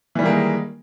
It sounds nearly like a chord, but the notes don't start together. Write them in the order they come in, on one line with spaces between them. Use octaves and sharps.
E3 G3 D#3 A#3 G#3